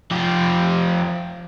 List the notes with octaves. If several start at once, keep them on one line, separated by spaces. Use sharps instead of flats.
F3 G4